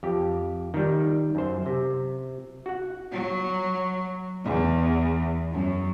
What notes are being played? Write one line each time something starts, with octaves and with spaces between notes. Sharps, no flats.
F2 G4
D#3 G3
F#2 C5
C3
F#4 F#5
F#3
E2
F#2